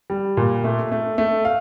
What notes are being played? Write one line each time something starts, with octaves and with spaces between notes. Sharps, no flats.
G3
A#2
A3
A3
A3
F5